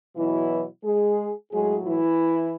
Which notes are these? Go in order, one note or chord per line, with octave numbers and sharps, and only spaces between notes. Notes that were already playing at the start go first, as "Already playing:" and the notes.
B2 E3 F#3 E4
G#3 G#4
A2 F#3 G#3 G#4
E3 E4